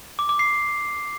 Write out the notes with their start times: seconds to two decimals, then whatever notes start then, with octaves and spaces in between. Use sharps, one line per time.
0.19 D6
0.29 D6
0.39 C7